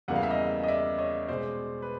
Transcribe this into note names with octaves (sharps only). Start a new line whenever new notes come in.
E2 C#3 E3 G3 A#3 F#5
F5
E5
D#5 F5
D#5
D5 E5
C#5 D#5
B2 G#3 C5 D5
B4